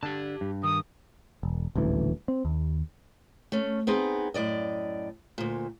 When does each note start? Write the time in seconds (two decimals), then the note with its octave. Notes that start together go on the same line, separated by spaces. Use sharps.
0.03 D3 D4 G4 A5
0.41 G2
0.63 D#3 D#6
1.43 E1
1.76 D#1 A1 D2 E3
2.28 C4
2.45 D#2
3.52 A3 C#4
3.87 B3 C4 D#4 G#4
4.34 F#2 A2 D5 D#5
5.38 D2 A#2